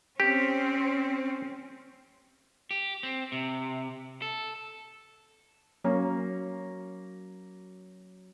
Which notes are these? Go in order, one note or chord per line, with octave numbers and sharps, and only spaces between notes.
C4 C#4 G4
G4
C4
C3
A4
F#3 A#3 C#4